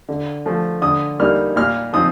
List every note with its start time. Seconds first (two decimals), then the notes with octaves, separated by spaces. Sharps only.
0.09 D3
0.46 F3 A3
0.82 D3 D#6
1.19 G3 A#3 D#4 F6
1.56 A#2 F6
1.93 F3 C4 D#4 D#6